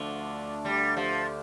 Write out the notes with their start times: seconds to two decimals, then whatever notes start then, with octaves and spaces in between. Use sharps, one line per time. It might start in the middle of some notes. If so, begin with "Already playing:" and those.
Already playing: D2 D3 F3 A3 D4
0.65 G3
0.97 F3